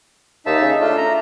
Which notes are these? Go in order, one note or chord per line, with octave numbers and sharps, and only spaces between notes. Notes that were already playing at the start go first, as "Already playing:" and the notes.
D#2 D#4 E5 A5
C#3
A3 D4 F4
A#5